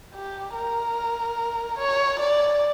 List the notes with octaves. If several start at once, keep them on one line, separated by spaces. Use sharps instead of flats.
G4
A#4
C#5
D5